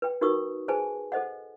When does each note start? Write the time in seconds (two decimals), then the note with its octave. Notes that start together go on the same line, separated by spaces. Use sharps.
0.02 B4 G5
0.21 D#4 F#4 A#4 B4 C#6 D#6
0.68 G#4 B4 C5 G#5 A5
1.12 A4 C5 D#5 F#5